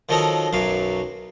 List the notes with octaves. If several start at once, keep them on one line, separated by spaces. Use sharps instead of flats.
D#3 F3 F#3 D#4 A4 D#5
B1 F#2 F#3 F5